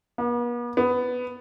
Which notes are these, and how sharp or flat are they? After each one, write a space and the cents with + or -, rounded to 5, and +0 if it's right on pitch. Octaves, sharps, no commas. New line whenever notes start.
B3 -45
B3 +10